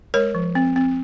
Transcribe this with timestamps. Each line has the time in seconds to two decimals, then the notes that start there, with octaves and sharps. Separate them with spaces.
0.14 G#3 A#4 C#5
0.35 F3
0.55 C4
0.76 C4